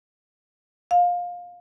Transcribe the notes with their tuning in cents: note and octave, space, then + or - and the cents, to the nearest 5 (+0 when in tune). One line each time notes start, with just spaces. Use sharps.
F5 +20